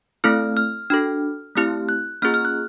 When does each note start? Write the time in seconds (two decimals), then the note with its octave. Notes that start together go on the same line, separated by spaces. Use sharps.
0.24 A3 C4 E4 A4 F6
0.57 F6
0.90 D4 F#4 A4 F6
1.56 A3 C4 E4 G4 F6
1.89 F#6
2.22 A#3 C#4 F4 G#4 F6
2.34 F6
2.45 F#6